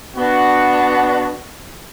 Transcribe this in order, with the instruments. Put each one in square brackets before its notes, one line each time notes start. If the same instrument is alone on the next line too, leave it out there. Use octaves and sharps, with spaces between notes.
[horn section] B3 D4 F#4